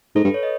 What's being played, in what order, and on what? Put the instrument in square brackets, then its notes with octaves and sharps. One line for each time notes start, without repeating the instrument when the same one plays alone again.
[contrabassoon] G#2 [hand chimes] A4
[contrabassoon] G2 [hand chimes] B4
[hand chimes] C#5
D#5